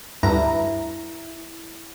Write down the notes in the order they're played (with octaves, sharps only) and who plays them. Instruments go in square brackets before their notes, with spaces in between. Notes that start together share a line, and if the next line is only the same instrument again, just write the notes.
[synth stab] D2 G2 A#5 [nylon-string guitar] E4